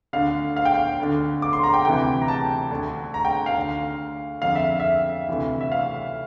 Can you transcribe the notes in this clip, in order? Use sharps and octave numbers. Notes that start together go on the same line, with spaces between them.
D2 D3 F5
F5
G5
F5
D2 D3
D6
C6
A#5
G5
D2 C3 E3 G5
A#5
A5
D2 D3
A#5
G5
F5
D2 D3
F2 D3 F5
E5
E5
D2 C3 E3
E5
F5